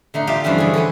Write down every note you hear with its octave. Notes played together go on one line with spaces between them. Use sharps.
D3 A3 D#4
F4 G4 D5 E5 F5
G2 E3 F3 C#4 F#5
D3 G#4
A4 B4 C#5 G#5